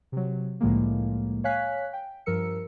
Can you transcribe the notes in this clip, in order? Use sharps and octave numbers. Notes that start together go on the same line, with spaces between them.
C3 F#3
C2 A2 D3 F3 G#3 A#3
C#5 F5 G#5 F#6 B6
G5
G2 F3 A#4 E6 C#7